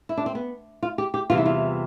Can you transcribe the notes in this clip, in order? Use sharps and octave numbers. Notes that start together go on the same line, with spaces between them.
E4
D4
C4
B3
F4
G4
G4
E2 C3 E3 G3 F4
E4
F4